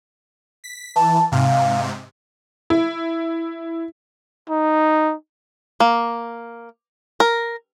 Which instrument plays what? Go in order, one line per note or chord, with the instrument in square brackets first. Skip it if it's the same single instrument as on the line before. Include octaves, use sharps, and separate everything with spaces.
[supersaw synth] B6
[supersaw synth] E3 [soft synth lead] A5
[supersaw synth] G#2 C3 [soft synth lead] F5
[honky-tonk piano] E4
[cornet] D#4
[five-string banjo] A#3
A#4